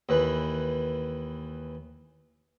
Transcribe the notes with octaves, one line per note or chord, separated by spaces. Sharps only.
D#2 E3 B4